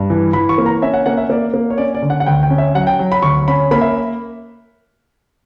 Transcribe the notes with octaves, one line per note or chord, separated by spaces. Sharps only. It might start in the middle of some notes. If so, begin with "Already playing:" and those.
Already playing: G2
E3
E3 B5
C#6
A#3
A#5
C#4 E5
F#5
A#3 F#5
E5
A#3 D5
A#3
C#5
C#4 D5
D5
D3
F#5
F#5
D2 G5
G5
C#4
E5
F#3 F#5
G5
F#3
B5
D2 C#6
C#4 B5
A#3 B5
E5